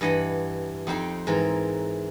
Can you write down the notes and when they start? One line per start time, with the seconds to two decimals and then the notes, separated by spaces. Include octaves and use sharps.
0.01 G2 E3 D#5 F#5 B5
0.87 F2 C4 D#4 C5 G5
1.27 G#2 E3 A#4